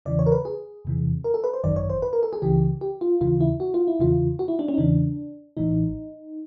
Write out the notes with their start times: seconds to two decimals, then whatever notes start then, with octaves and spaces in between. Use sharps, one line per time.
0.06 E2 C#3 E3 D5
0.19 C#5
0.26 A#4
0.32 B4
0.45 G#4
0.85 E2 C3 E3
1.24 A#4
1.34 A4
1.44 B4
1.54 C5
1.64 G#1 F#2 D#3 D5
1.76 C#5
1.90 C5
2.02 B4
2.13 A#4
2.23 A4
2.33 G#4
2.42 C#2 C#3 E3 G4
2.81 G4
3.01 F4
3.21 D#2 C#3 E3 F4
3.41 E4
3.60 F#4
3.74 F4
3.88 E4
3.99 E2 C#3 E3 F4
4.39 F#4
4.48 E4
4.59 D4
4.68 C#4
4.74 D#4
4.78 E2 C#3 E3 D4
5.57 A1 A2 E3 D#4